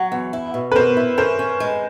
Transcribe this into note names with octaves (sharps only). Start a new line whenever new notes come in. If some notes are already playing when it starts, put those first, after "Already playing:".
Already playing: F#3
E2
E4
B2
B4
B2 A#4 C5
E4
C#4 A#4 C5
C#4
G#3